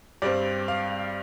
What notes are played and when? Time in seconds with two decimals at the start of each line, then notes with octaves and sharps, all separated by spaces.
0.22 G2 G3 C4 D5
0.68 F5